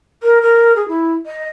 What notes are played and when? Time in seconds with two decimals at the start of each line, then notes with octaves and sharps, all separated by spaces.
0.22 A#4
0.42 A#4
0.76 G#4
0.88 E4
1.26 D#5